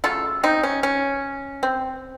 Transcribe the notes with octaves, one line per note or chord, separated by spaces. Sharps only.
C#3 F#3 A3 F4 A4
C4 D#4
C#4
C#4
C4